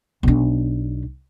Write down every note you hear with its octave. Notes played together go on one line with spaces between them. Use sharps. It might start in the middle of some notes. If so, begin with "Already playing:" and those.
B1 D4